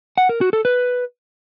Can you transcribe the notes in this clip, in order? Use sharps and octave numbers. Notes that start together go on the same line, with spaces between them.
F#5
A#4
F#4
A4
B4